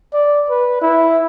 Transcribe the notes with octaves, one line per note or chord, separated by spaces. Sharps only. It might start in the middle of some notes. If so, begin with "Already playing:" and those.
D5
B4
E4